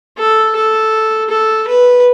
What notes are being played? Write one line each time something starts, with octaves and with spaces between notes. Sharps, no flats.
A4
A4
A4
B4